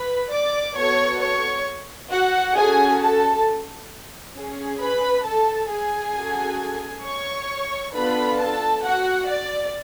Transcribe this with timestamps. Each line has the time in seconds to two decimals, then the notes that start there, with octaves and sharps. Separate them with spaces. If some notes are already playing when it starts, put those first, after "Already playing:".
Already playing: B4 B5
0.33 D5 D6
0.77 B3 F#4 A4 C#5 C#6
1.21 C#5 C#6
2.11 F#4 F#5
2.56 C#4 F#4 G#4 A4 G#5
3.01 A4 A5
4.36 C#4 G#4
4.80 B4 B5
5.25 A4 A5
5.70 G#4 G#5
6.15 C#4 F#4 A4
7.05 C#5 C#6
7.94 B3 D4 F4 A4 B4 B5
8.39 A4 A5
8.84 F#4 F#5
9.29 D5